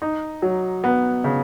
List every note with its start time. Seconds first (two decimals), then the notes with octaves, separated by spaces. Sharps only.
0.02 D#4
0.42 F#3
0.84 B3
1.24 C#3